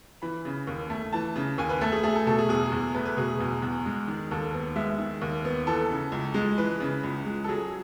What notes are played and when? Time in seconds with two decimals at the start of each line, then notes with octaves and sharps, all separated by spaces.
0.22 E3 B5
0.45 C#3
0.67 D#2
0.90 A3
1.13 E3 A5
1.36 C#3
1.58 D#2 G#5
1.69 B4
1.81 A3 A4
1.92 G#4
2.03 A3 G#4
2.16 A4
2.26 B2 A4
2.38 G#4
2.49 E2 G#4
2.72 E2
2.94 A3 B4
3.05 B4
3.17 B2 G#4
3.28 G#4
3.40 E2
3.62 E2
3.86 G#3
4.08 D#3
4.31 D#2 A4
4.54 B3
4.76 G#3 E5
4.98 D#3
5.21 D#2
5.45 B3
5.67 E3 A4
5.90 C#3
6.12 C#2
6.34 G#3
6.58 E3 B4
6.80 C#3
7.04 C#2
7.26 G#3
7.44 A4
7.48 F#3 G#4